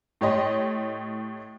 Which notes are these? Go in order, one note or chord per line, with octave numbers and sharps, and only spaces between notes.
A2 G4 C#5 D#5 C6